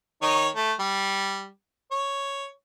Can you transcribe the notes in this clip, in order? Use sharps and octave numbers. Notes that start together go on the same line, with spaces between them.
D#3 D#4 C#5
A3
G3
C#5